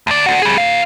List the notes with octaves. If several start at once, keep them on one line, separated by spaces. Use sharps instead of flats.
D2 D5
D4 F#4
G3 G#4
D3 F5